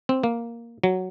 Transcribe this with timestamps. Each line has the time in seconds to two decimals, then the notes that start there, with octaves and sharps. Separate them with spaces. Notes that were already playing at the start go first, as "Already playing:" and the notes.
0.09 C4
0.23 A#3
0.84 F#3